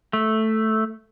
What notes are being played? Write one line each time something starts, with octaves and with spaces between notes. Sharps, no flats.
A3